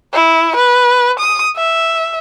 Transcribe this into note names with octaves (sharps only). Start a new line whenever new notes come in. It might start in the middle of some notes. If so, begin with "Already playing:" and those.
E4
B4
D#6
E5